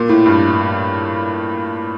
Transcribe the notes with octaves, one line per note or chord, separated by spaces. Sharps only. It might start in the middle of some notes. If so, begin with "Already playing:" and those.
Already playing: A#2
A2
G2